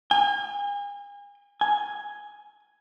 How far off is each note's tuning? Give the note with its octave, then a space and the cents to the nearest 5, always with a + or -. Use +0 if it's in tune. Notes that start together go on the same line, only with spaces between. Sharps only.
G#5 -40
G#5 +5